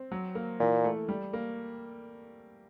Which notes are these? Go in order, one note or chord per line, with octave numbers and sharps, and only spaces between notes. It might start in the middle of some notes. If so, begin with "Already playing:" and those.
Already playing: C4
F#3
A#3
A#2 E3
A3
G3
A#3